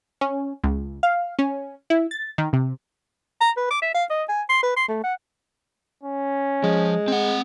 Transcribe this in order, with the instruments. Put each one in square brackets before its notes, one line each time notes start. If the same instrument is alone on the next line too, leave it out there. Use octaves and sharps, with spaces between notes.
[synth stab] C#4
C#2
F5
C#4
E4
A6
D#3
C3
[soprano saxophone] A#5
B4
D6
E5
F5
D#5
G#5
C6
B4
C6
A3
F#5
[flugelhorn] C#4
[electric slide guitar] F3 [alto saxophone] G#3
[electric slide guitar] C4 F#5